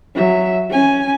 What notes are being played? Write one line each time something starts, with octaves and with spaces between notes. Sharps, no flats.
F#3 E5
C#4 G#5